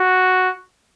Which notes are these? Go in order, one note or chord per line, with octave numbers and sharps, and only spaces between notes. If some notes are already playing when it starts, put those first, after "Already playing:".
Already playing: F#4